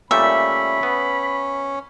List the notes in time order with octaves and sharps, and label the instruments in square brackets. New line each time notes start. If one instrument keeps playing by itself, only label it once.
[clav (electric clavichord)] A#2 G3 A3 [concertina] C#4 [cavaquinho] E5 [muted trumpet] B5
[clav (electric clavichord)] B3